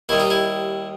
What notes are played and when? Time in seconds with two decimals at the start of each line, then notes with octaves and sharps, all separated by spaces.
0.09 D#2 D#3 G3 E4
0.20 D#4
0.30 E4